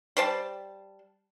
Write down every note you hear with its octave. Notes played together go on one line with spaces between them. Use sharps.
G3 C5 A5